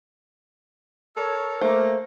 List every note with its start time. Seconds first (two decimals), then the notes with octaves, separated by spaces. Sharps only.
1.17 A4 A#4 C#5
1.61 A3 A#3 C5